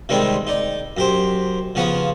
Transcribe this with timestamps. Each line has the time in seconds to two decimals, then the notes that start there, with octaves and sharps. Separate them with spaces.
0.09 C3 D#3 G3 G#3 C4
0.47 D#4 D5
0.97 F#2 G4 C5
1.75 C#3 F3 B3 C#6 D#6